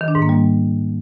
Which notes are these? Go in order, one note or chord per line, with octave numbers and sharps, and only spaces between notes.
D#3
D4
G#2
A#3
G3